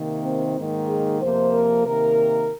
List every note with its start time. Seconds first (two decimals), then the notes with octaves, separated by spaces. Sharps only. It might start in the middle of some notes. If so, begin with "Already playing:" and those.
Already playing: C3 D#3 A#3
0.23 C4
0.56 G#2 D#3 A#3
0.88 G#4
1.21 F2 C3 F3 A#3 C5
1.53 A#4
1.85 C3 D#3 A#3 A#4